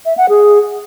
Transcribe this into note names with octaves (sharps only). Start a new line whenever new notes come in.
E5
F#5
G#4